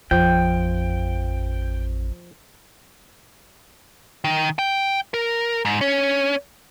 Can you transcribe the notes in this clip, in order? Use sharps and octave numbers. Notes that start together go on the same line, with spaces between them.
A1 F2 F3 G5
D#3
G5
A#4
G#2
C#4